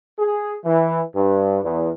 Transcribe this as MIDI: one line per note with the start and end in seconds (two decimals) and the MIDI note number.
0.19 0.55 68
0.65 1.02 52
1.14 1.59 43
1.64 1.90 40